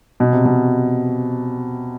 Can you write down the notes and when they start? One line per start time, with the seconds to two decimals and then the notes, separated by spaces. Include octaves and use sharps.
0.20 B2
0.33 C3
0.45 B2